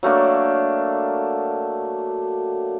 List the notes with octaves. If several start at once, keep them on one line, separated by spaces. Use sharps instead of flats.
F#3 A3 A#3 D4